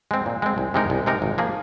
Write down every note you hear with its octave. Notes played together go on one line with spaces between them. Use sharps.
G#3 C4
A#2
G#3 C4
C2
C3 G#3 D#4 A#4
C2
C3 G#3 D#4 A#4
G#1
F3 A#3 G#4